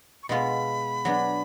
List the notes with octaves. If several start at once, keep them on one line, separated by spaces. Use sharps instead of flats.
C#6
B2 G#3 B3 F4 B5
F#3 B3 D4